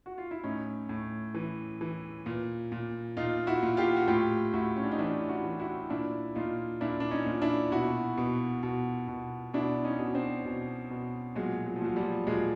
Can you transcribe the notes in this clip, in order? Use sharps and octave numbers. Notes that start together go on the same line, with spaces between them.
F#4
F4
E4
A2 C#4 D#4
A2
E3
E3
A#2
A#2
A#2 D#4 F4
E4 F#4
A#2
F4 G4
F#4
A2 F4 G4
A2 E4 F#4
C#4
D4
D#4
E3 D4 E4
E4 F#4
E3
E4 F#4
A#2 D4 E4
A#2 D#4 F4
A#2 D4 E4
D4
C#4 D#4
A#2
D4 E4
B2 E4 F#4
B2
B2
B2
B2 D4 E4
C#4 D#4
B2
C4 D4
B2
B2
A#2 F#3 G#3
F#3
F3
A#2 F#3
F3 G3
A#2 F#3 G#3